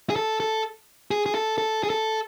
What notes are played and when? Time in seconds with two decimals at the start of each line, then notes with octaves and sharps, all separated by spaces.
0.10 G#4
0.16 A4
0.40 A4
1.11 G#4
1.26 G#4
1.35 A4
1.58 A4
1.83 G#4
1.90 A4